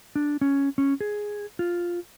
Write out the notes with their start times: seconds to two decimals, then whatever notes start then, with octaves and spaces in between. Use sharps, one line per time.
0.15 D4
0.41 C#4
0.78 C#4
1.01 G#4
1.59 F4